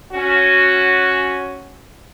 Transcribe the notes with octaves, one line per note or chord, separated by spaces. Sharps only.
C#4 F#4